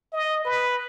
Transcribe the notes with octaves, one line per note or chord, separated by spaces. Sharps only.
D#5
B4